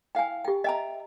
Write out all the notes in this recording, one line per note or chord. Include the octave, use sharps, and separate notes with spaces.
E4 F5 G5 G#5
G4 G5
D#5 E5 G5 A#5